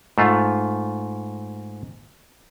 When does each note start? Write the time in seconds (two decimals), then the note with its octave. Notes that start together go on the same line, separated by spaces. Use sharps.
0.18 G#2 A3 F4